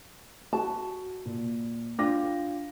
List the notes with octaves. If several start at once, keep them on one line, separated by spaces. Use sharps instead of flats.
F#4 A5
A#2
D4 F4 G5 A#6